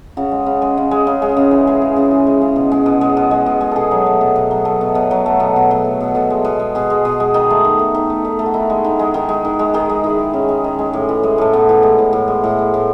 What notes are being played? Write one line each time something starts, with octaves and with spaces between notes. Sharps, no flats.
C#3 F#4
G#3
C#3
G#3
C#3
G#3
C#3
G#3
C#3
E3
G#3
C#3
C#3
E3
G#3
C#3
B2
G#3
B2
G#3
B2
G#3
B2
G#3
B2 G#4 A4
F#3
A3
B2
B2
F#3
A3
B2
B2
F#3
A3
B2
B2
F#3
A3
B2
B2 A4
G#3
B2
G#3
B2 G#4
G#3
B2
G#3
D#3 D#4
A3
D#3
A3
D#3
A3
D#3
A3
F#4
D#3 E4
G#3
D#3
G#3
D#3
G#3
D#3
G#3
D#3 G#4
G#3
D#3 E4
G#3
D#3 C#4
G#3
D#3
G#3
A2
E3
G#3
A2 A3
A2 B3
E3
G#3
A2
A2
G#3
A2
G#3
A2